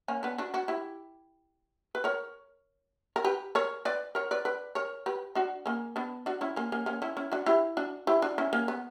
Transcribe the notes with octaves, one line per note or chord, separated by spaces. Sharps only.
A#3 C#4
B3 D4
D4 F#4
D4 F#4
E4 G4
B4
A#4 C#5
A#4
G4 B4
A#4 C#5
B4 D5
A#4 C#5
B4 D5
B4 D5
A#4 C#5
G4 B4
D4 F#4
A#3 C#4
B3 D4
D4 F#4
C#4 E4
A#3 C#4
A#3 C#4
A#3 C#4
C#4 E4
C#4 E4
D4 F#4
E4 G4
D4 F#4
E4 G4
D4 F#4
C#4 E4
A#3 C#4
B3